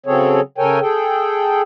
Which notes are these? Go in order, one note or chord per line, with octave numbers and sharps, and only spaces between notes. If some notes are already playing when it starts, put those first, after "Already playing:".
C#3 F#3 C4 G#4 A4 C#5
C#3 A4 A#4 C#5 G5 G#5
G#4 A4 G5